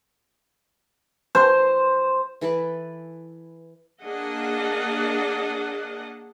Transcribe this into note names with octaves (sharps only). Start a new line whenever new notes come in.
C5
E3 A4 B4 D5
A#3 D4 G#4 D#5 F#5